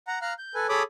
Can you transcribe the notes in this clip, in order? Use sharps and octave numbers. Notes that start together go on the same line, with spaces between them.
F#5 A#5
F5 A#5 F6 F#6
G6
A4 B4 G#5
G#4 A4 C#5 B5 D6 D#6